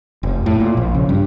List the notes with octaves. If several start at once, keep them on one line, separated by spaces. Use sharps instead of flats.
F1
A2
A#2
A#1
C#3
G2